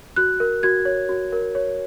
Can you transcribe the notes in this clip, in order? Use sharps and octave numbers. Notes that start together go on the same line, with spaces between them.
F#4 F#6
A#4
F#4 G#6
C#5
F#4
A#4
C#5